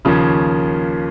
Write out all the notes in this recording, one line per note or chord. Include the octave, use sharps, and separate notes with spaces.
D#2 C#3 F3 A#3 C#4